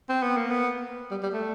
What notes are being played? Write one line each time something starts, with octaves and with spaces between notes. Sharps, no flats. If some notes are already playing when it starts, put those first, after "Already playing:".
C4
B3
A#3
B3
G3
G3
A3